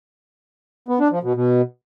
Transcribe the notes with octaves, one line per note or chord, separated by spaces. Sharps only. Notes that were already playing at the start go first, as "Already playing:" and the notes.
B3
D4
F3
B2
B2